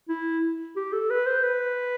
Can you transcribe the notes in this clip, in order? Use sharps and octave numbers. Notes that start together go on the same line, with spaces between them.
E4
G4
A4
B4
C5
B4